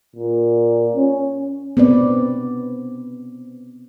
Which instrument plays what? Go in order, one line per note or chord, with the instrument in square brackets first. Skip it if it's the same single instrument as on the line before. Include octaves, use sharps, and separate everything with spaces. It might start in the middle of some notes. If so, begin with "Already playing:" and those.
[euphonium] A#2
C#4
[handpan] B3 C4 B4 D5